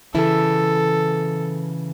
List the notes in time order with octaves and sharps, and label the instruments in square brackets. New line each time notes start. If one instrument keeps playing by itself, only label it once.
[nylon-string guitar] C#3 E3 E4 [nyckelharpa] A4